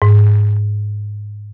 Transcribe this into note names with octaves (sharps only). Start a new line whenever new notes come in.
G#2